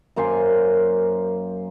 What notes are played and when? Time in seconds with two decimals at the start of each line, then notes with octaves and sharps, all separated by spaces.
0.16 F#2 A#3 C5 G#5